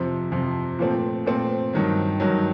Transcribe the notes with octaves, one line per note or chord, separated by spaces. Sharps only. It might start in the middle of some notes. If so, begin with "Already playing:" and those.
Already playing: F2 C3 F3
F2 C3 F3
A#2 F3 A3 C4
A#2 F3 A3 C4
G2 D#3 F#3
G2 D#3 F#3